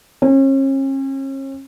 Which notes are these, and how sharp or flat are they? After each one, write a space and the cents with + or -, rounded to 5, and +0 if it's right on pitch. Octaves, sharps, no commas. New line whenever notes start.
C#4 -40